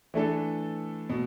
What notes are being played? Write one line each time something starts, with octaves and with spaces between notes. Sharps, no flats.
E3 A3 D4 A4
B2